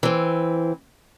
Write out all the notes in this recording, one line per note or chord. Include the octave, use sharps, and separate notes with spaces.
E3 C4